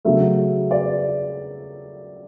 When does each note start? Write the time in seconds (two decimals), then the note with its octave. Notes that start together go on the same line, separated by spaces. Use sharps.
0.05 C#3 F#3 A3 E5
0.71 D5